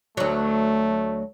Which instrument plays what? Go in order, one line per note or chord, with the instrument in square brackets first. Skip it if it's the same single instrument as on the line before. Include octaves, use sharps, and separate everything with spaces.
[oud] D2 F#3 [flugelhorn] A3